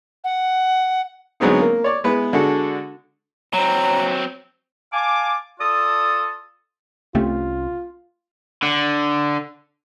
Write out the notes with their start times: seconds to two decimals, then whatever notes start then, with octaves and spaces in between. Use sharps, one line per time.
0.24 F#5
1.40 D3 F#3 G#3 B3 C4 D#4
1.61 A#3
1.84 C#5 D5 C#6
2.04 G#3 B3 E4 B4
2.33 D3 G#3 F#4 A4
3.54 F#3 C4 A#5
4.93 F5 G#5 A5 D6
5.60 F4 A4 D5 A5 D#6
7.15 C2 A3 C4 C#4 F4 G4
8.62 D3